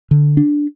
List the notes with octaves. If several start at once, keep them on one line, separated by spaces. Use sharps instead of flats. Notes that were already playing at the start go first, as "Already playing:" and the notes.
D3
D4